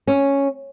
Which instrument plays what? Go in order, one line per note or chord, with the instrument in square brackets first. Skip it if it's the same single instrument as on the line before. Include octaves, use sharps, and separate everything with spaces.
[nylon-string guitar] C#4